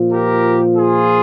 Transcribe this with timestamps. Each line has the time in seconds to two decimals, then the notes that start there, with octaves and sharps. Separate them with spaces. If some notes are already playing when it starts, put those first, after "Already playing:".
Already playing: A#2 F3
0.12 G4 A#4
0.76 F4 G#4